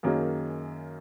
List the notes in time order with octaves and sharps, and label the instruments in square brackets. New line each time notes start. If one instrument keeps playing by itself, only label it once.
[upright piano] F#2 D#3 A#3 C#4 G#4